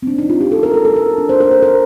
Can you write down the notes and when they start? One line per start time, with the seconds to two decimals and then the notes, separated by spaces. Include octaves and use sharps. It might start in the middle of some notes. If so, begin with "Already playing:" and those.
0.03 C4
0.07 D4
0.18 D#4
0.29 F4
0.41 G4
0.52 A4
0.63 A#4
0.74 A4
0.85 A4
0.96 A#4
1.18 D4
1.29 C5
1.40 A#4
1.52 C5
1.63 A#4